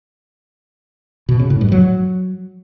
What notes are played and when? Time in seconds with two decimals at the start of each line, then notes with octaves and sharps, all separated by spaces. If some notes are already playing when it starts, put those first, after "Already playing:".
1.29 B2
1.39 C#3
1.50 A2
1.61 G2
1.72 F#3